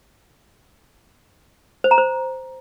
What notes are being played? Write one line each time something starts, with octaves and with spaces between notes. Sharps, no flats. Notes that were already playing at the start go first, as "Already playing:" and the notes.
C5
A#5
C5